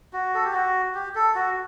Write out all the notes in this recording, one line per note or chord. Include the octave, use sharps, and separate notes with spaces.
F#4
A4
G4
F#4
G4
A4
F#4